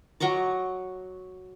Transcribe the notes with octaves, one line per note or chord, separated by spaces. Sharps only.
F#3 D#5 C#6 D6